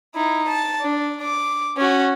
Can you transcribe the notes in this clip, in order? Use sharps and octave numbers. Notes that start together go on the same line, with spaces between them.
D#4 E4
A5
D4
D6
C#4 F#4